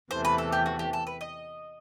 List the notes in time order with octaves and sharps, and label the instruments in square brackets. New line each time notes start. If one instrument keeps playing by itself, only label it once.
[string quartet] E2 C3 E3 A3 [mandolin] C5
[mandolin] B4
A4
G4
F#4
G4
A4
B4
D#5